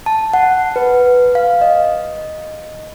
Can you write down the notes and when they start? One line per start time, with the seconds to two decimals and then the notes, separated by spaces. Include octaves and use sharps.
0.06 A5
0.34 F#5
0.76 B4
1.35 F5
1.61 D#5